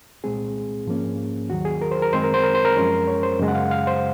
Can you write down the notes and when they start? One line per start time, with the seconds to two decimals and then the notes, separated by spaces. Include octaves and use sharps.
0.24 C2 A#2 G#3 C4 G#4
0.86 G#2 F3 A#3 C#4
1.50 D#2 D#3 F#3 F#4
1.65 G#4
1.81 A#4
1.91 C5
2.02 A#4
2.13 F#2 D#3 G#3 C4 C5
2.24 A#4
2.34 C5
2.44 A#4
2.55 C5
2.65 A#4
2.76 F#2 F3 G#3 C#4
3.07 C#5
3.23 C5
3.40 F#2 C#3 G#3
3.48 F#5
3.54 F5
3.71 F5
3.87 C5